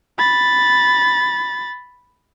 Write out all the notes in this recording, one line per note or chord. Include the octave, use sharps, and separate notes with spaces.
B5 A6